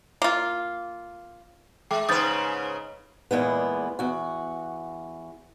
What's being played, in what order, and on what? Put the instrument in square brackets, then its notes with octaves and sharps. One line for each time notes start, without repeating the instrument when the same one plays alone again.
[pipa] A#3 F4
[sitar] G#3 [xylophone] G5 D6
[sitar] G#2 C#3 B4 [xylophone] D#6 G6 A6
[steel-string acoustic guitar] E2 A#2 G#3 B3
E2 F#4